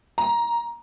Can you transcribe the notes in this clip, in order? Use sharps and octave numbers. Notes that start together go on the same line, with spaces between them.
A#5